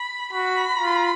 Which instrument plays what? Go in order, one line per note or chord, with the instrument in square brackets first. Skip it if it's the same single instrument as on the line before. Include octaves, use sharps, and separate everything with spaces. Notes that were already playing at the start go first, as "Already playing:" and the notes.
Already playing: [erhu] B5
[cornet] F#4 [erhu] B5
[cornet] F4